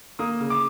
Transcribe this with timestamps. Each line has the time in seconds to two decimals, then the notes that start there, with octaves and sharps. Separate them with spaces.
0.19 A#3 D#6
0.40 C#3
0.50 D6